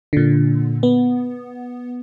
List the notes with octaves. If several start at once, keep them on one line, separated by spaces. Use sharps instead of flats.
A#2 D3
B3